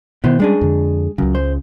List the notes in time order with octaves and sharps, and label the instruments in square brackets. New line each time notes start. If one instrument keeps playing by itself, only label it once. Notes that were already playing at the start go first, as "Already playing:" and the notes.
[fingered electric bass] B2 D#3 [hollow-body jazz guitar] B3 E4 C5
[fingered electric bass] G3 C#4 [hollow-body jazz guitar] G#3 D4 G#4
[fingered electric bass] F2 D3
[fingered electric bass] C#2 C#3 [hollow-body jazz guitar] F#2
[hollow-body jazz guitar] C5